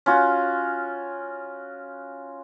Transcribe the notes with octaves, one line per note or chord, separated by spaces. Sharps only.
C#4 F4 F#4